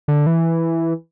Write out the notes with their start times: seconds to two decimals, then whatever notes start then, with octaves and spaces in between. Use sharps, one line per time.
0.08 D3
0.27 E3